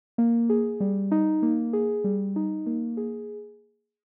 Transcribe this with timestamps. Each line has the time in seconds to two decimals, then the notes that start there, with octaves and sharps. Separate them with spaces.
0.18 A#3
0.50 G#4
0.80 G3
1.11 D#4
1.42 A#3
1.73 G#4
2.04 G3
2.36 D#4
2.66 A#3
2.97 G#4